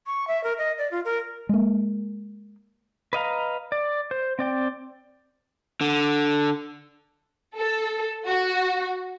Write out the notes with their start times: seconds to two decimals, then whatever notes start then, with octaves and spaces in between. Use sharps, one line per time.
0.06 C#6
0.27 E5
0.44 A#4
0.58 D#5
0.78 D5
0.91 F4
1.05 A#4
1.49 G#3 A#3
3.13 B4 D#5 F5 A#5
3.72 D5
4.11 C5
4.39 C4 D5 G5
5.81 D3
7.56 A4
8.27 F#4